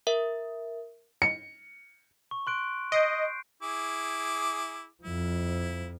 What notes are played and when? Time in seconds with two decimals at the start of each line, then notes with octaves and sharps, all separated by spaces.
0.07 A#4 E5
1.22 C#7
2.31 C#6
2.47 C6 F#6 D7
2.92 D#5 G6 C7 D7
3.63 E4 G#4 D6
5.03 F2 F3 E4